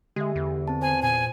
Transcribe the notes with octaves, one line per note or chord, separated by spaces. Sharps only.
D3 G#3 G4 E5
E2
C4 A5
C5 G#5
A#2 G#5